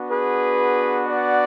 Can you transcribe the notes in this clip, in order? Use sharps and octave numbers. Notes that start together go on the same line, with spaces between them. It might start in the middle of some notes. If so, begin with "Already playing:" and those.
Already playing: B3 D4 F#4
G#4 B4
D5 F#5